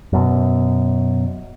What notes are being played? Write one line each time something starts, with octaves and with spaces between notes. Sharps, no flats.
F#2 B2